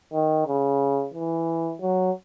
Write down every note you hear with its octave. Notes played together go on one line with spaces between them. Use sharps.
D#3
C#3
E3
F#3